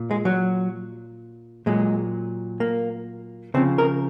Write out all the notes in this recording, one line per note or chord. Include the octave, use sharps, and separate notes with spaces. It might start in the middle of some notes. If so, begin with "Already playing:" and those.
Already playing: A#2
G#3
F#3
A#2 F#3 G#3
A#3
C#3 F3 C4
A#4